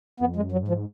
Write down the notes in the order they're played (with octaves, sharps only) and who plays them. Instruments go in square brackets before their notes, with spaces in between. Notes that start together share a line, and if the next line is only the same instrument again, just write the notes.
[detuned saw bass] F2 [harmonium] B3
[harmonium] G#3
[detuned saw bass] F#2
[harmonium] F#3
[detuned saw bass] G#2
[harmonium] F3